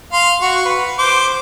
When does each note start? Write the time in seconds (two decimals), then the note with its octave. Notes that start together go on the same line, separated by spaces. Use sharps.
0.13 F5 C6
0.42 F#4 C#6
0.65 B4
0.98 C5 D6